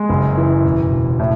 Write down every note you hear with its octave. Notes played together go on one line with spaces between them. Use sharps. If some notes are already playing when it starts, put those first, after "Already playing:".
Already playing: G#3
F#1
E3
E1
E1
A2